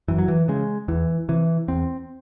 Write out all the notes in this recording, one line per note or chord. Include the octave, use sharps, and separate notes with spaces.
F#2 E3
F#3
E3
C#3 G#3
E2 E3
C3 E3
E2 C4